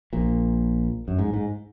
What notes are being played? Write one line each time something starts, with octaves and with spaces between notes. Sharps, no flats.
A#1 A#2
F#2
G#2
G#2